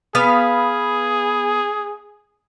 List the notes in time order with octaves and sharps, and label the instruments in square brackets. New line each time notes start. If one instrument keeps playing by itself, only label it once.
[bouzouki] B3 B4 F5 [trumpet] G#4